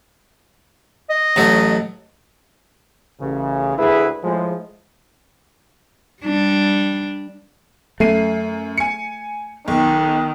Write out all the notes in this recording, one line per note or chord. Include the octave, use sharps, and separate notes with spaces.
D#5
A1 F#3 A3
A1 C#3
D2 A2 E4 G#4 B4
A2 F3 G#3
G3 D4
F#2 A3 C7 D#7
G#5 C#7
B1 D#3